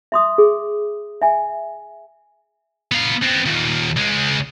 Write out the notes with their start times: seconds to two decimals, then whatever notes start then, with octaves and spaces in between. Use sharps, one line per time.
0.12 E5 C6 D#6
0.38 G#4
1.22 E5 G#5
2.92 B3 F5
3.22 B3 C4
3.46 D#2 A#2
3.96 C#2 G#3